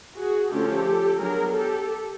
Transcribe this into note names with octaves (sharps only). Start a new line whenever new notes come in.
F#4 G#4
D3 F3 A3 C#4 G4 A4
F#3 B3 D4 G#4 A#4
G4 A4